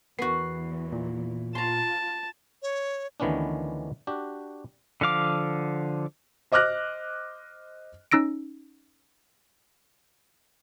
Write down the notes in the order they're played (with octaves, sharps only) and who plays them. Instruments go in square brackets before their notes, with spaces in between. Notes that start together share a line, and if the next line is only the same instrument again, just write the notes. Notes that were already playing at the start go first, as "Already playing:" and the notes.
[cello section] E2 E3 [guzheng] B3 F#4 [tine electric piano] C7
[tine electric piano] A#2
[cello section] F4 [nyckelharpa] A5 [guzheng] A#5 C6
[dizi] C#5
[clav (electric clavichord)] D2 D#3 E3 B3 C#4 D4
D4 F#4 G4
[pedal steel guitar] D3 F3 F5 D6
[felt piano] C5 D#5 D6 F6 F#6 A#6
[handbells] C#4 D#4 E6 A#6 D7